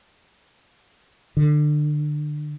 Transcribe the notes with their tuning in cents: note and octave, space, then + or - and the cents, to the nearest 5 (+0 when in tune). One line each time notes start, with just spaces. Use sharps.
D3 +25